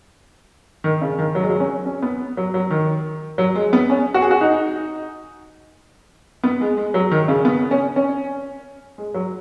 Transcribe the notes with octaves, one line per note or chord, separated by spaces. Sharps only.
D#3
C#3
D#3
F#3
G#3
F#3
C#4
C#4
B3
F#3
F#3
D#3
F#3
G#3
B3
C#4
F#4
G#4
F#4
D#4
B3
G#3
G#3
F#3
D#3
C#3
B3
C#4
C#4
G#3
F#3